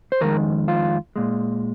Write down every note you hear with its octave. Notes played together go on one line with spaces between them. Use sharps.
C5
F2 D#3 G#3 A#4
F4
A#2 G#3